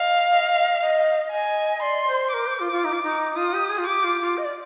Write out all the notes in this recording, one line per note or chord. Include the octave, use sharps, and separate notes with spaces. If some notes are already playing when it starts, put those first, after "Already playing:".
Already playing: D#5 F5
D#5
D#5
D#5 G#5
D5 C6
C5
A#4 D6
C5
F4
F4
D#4
F4
D#4
F4 D#6
G4
G#4
F4
G4 D6
F4
F4
D#5
D5